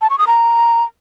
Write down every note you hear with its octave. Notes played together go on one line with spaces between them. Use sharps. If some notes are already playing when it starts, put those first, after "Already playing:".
A5
C#6
D#6
A#5